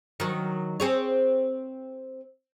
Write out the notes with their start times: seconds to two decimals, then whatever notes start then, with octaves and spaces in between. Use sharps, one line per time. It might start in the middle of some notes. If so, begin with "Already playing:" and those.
0.20 D#3 F#3
0.80 C4 G#4 C#5